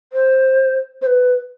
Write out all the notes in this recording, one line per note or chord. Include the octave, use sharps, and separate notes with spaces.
C5
C5
B4